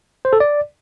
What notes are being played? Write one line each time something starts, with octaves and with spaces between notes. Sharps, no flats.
C5
A4
D5